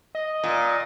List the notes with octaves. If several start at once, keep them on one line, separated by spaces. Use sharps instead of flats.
D#5
A#2